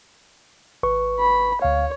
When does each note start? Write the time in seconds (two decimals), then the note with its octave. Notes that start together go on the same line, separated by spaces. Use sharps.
0.83 G#1 B4 C#6
1.20 B5
1.62 D2 C#5 F5